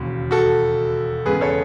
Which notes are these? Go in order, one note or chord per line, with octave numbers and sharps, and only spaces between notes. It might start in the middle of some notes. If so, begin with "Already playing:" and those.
Already playing: E1 D#2 C#3
F#4 A4
E2 C#3 G#3 B3 G#4 B4
A4 C#5